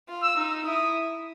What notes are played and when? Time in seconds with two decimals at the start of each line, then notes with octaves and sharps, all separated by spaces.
0.09 F4
0.22 E6
0.37 D#4
0.64 E4 D#6